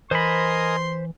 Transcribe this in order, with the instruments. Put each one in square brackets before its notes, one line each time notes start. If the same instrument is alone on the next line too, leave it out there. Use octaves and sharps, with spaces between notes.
[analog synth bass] E3 [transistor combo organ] A#4 D#5 G#5 [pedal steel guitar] C5 B5 [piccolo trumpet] C6